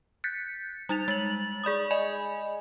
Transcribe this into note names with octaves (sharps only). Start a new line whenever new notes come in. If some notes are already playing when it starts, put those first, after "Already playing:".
F#6 G6 A6 B6 C#7
G3 D#4 A6 F7
G#3 A6 F#7
G#4 D5 B5 D#6
D5 D#5 G#5 B5